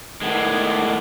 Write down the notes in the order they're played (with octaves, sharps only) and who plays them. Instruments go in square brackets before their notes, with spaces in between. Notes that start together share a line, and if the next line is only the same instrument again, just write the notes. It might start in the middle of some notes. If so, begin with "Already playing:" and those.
[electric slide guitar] A2 G#3 [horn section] D#3 B3 D4